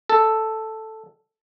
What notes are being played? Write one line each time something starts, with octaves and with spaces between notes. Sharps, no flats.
A4